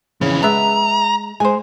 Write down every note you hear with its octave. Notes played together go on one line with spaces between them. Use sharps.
F2 C#3 E3
G#3 B3 D4 E5 A#5
G#3 C5 G#5